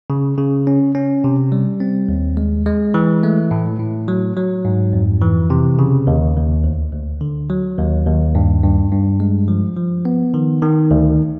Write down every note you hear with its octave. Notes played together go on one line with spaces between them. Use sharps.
C#3
C#3
C#4
C#4
C3
G3
C4
D#2
G#3
G#3
E3
A3
A2
A2
F#3
F#3
G#2
F2
E3
C3
C#3
D#2
D#2
D2
D2
D3
F#3
D#2
D#2
G2
G2
G2
G#3
F3
F3
B3
D#3
D#3
D2